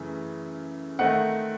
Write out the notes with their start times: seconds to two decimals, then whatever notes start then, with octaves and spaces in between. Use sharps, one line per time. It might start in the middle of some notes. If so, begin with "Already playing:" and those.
Already playing: F#2 C#3 E3 A3
0.99 D#3 A3 C4 D#4 F#5